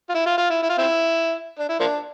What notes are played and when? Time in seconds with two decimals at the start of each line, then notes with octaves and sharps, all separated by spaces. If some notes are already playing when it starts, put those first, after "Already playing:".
0.09 F4
0.14 E4
0.26 F4
0.38 F4
0.50 E4
0.63 E4
0.70 F4
0.78 C4 E4
1.59 D4
1.69 E4
1.80 F3 A#3 D4